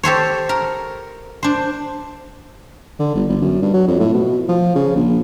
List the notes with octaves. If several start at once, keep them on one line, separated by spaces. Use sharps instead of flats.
G4 A4 C5 C#5
A#4
D4 C5
D3
G1
G1
F#2
G2
F#3
F2
A2
B2
F3
C#3
A#1